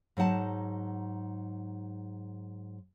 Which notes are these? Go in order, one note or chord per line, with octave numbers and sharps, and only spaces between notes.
G#2 F#3 D#4 F#5 A5